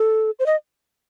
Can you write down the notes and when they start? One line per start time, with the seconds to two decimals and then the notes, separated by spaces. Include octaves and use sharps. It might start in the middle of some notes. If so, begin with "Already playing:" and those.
Already playing: A4
0.39 C5
0.46 D#5